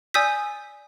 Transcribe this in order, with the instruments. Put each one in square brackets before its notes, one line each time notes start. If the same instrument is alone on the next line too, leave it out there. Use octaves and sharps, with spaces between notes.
[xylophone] D5 G#5 D#6 E6 G6 B6